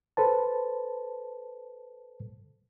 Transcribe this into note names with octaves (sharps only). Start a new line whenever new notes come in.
A4 B4 C5 A5